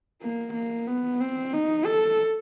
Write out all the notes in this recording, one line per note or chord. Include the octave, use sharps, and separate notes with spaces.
A#3
A#3
B3
C4
D#4
A4